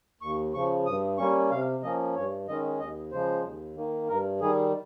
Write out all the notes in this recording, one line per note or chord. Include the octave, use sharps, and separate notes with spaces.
D#2 C#6
C#3 F3 C#6
G2 D#6
G3 A#3 C#4 C#6
C3 F5
F3 A#3 C#4 D#5
G2 C#5
D#3 G#3 C#4 D#5
D#2 D#5
C#3 F3 G#3 C5
D#2
D#3 A#3
G2 A#4
D#3 G3 G#4